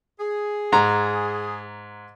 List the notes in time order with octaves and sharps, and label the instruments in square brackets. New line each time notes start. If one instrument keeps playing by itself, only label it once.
[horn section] G#4
[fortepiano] G#2 A#5